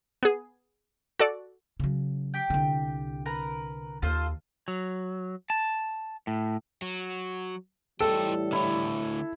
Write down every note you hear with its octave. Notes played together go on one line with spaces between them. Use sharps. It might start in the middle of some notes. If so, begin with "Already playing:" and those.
B3 G#4
F#4 A4 D5
C#3 F#3
G4 G5
C2 D3
A#4 B4 A#5
D#2 F4 A4 C5
F#3
A5
A2
F#3
A2 E3 G3 F4 A4 D#5 G5
D3 A3 E4 C#5